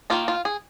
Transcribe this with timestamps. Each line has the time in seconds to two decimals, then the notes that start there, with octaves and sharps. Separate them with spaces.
0.10 D#3 A#3 D#4 F4
0.28 F4
0.45 G#4